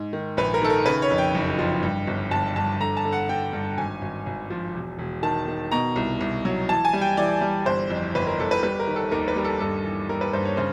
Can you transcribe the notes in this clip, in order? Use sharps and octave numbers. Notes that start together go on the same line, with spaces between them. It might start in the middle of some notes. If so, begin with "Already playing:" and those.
Already playing: G#2
D#3
A#1 B4
A#4
D#3 A4
A#4
C#3 B4
C#5
F2
G5
F#1
F3
G2
G1
G1 A5
G2 A5
D3 A#5
A5
D3
F#5
D3 G5
G2
G#1 G#5
G#1
G#1
F3
E1
E1
D#3 A5
D#3
B2 A#5
C2
C2
F#3
E3 A5
G#5
G3
G5
E3 D5
G3
G1 C5
F2
G1 B4
A#4
G1 A4
B4
G3 B4
A#4
D#3
A4
D#2 A#4
B4
G3 A#4
A4
G2 A4
E3
G3 A#4
B4
G2 C5
C#5
C#3 C5